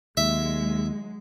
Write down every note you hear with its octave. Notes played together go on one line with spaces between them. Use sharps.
D#2 F#3 G#3 E5